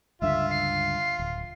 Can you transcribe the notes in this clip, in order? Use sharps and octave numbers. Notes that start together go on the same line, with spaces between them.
C#2 G2 D3 F4 E5
C7
D1